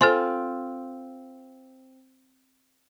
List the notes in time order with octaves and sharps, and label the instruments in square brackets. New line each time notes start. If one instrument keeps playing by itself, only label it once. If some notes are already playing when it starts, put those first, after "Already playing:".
[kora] C4 F4 [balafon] A4 C5 G#5